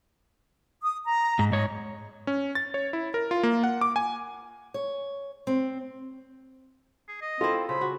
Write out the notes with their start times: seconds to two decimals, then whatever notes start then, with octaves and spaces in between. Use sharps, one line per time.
0.82 D#6
1.05 A#5
1.39 G#2
1.52 G#2 C#5 D#5
2.27 C#4
2.55 A6
2.74 C#5
2.93 E4
3.14 A#4
3.31 F4
3.43 A#3
3.64 F#5
3.81 D6
3.96 G#5
4.74 C#5
5.47 C4
7.08 G#4
7.21 D#5
7.41 C4 E4 F4 A4
7.69 C#3 C5 B5
7.81 F#4